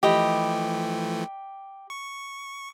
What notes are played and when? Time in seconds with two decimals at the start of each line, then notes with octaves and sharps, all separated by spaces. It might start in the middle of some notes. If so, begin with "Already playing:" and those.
0.03 E3 F3 A3 G4 D#5 B5
1.90 C#6